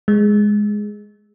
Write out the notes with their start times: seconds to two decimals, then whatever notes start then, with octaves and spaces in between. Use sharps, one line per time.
0.08 G#3